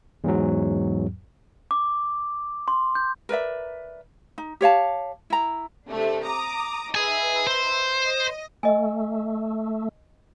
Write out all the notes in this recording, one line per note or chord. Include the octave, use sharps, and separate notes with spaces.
E2 G#2 F#3
D6
C6
G6
A#4 B4 D5 E5
D#4
G4 C#5 F5 A5
E4 A#5
C3 A3 D4
A#5 D6 D#6
D#4 G#4 B4 E5 G#5
C5
D#5
A3 D#5 G#5